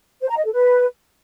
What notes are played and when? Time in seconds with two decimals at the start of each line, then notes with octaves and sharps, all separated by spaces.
0.22 C5
0.29 A#5
0.37 D#5
0.45 A4
0.53 B4